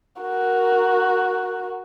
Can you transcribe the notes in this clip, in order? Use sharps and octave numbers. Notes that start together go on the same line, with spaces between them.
F#4 A#4